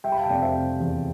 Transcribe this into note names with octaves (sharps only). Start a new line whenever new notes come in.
G3 E5 G5
B5
F5 A5
G5
F1 D5 F5
C5 E5
C3
E2